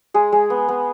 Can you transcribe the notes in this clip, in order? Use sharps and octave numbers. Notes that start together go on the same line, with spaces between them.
G#3 G#4
G#3
B3
B3